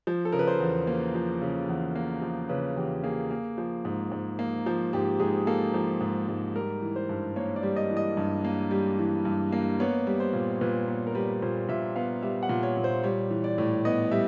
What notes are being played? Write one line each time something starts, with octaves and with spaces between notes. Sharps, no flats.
F3
A4
C#3 A#4
B4
C5
E2
A#3
F3
C#3
E2
A#3
F3
C#3 B4
E2 G4
A#3 G#4
A#3
F3
G#2
G#2
A#3
F3
G#2 G4
G#2 G#4
A#3 A4
F3
G#2
G#2
G3 A#4
E3
C5
G2
A#3 C#5
D5
G3
D#5
E3
D#5
G2
A#3
G3
E3
G2
A#3
B3 C#5
G3
C5
A#2
A#2 B4
B3
A#4
G3 B4
A#2 C5
A#2 E5
B3 F5
G3 E5
F#5
A#2
C#5
A#2
C5
G3 C#5
E3
D5
A2
B3 D#5
G3 E5